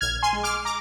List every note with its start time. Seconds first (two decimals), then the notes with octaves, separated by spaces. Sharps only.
0.01 A#1 F6 G#6
0.22 G#5 C6
0.33 G#3
0.43 D6 F6
0.65 A#5 D6